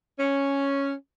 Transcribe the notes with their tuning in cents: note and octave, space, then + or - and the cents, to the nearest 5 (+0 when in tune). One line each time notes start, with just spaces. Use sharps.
C#4 +0